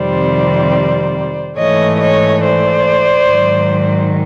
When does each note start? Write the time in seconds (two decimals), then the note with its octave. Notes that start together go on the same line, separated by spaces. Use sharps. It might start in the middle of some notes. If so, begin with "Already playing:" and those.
Already playing: F2 C3 D#3 G3 C5 D5
1.57 G#2 E3 A3 C#5 D#5
2.00 C#5 D#5
2.43 C5 D5
3.29 G#2 D#3 F#3